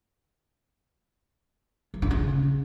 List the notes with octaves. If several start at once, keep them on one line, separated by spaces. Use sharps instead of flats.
F3
D3
C#3